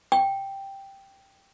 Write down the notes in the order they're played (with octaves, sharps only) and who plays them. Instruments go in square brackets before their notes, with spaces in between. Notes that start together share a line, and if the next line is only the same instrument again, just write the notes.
[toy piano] G5